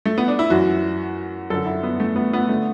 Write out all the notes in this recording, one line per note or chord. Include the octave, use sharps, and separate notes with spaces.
A3
B3
D4
E4
F#2 E3 F#4
F#2 D3 A4
E4
B3
A3
B3
B3
A3
D3